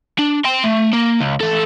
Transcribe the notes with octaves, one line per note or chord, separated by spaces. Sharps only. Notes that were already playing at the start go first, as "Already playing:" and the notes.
D4
G5 C6
A3
A#3
C#2
E3 A4